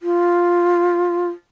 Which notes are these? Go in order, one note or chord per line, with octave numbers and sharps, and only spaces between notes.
F4